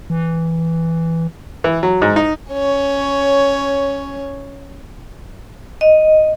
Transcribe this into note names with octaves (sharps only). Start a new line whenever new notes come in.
E3
E3
F#3
G#2
D#4
C#4 C#5
D#5